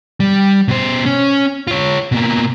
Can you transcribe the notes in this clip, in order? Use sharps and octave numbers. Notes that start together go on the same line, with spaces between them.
G3
B2 C5
C#4
F4 C#5
B2 A#3